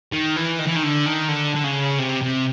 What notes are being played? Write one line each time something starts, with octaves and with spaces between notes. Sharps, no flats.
D#3
E3
D#3
E3
D#3
D3
D#3
D3
D3
C#3
C3
C3